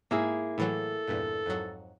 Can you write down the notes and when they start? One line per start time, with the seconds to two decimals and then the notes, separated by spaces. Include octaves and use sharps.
0.11 G#2 A#3 E4 G#4
0.58 A2 E3 F#3 A4
1.08 E2 G2 A#2
1.46 F2 G#2 F#3